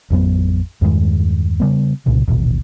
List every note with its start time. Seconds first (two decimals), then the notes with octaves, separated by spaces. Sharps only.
0.10 A1 F2 F#3 B3
0.82 E2 G2 D#3 G#3
1.60 C#3 G3 B3
2.06 C2 A#2 C#3
2.28 D#1 A1 B2